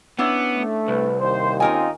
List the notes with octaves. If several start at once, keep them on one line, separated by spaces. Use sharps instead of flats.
B3 C#4 D4 E4
A3
C2 B4
D#2 C5
C4 C#4 D#4 F4 A#4 G#5